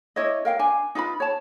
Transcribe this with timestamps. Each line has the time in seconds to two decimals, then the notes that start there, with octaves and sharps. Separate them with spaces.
0.16 D4 E4 C#5 D#5
0.45 A#4 F5 G5
0.59 D4 G#5
0.95 D#4 F4 B4 B5
1.20 C#5 A5